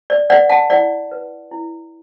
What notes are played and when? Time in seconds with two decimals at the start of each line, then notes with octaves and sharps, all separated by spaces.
0.10 D5
0.29 B4 D5 F#5
0.49 F#5 A5
0.70 E4 D5 F#5
1.11 B4
1.51 E4